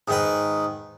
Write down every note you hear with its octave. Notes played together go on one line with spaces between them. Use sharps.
G#2 D#3 B4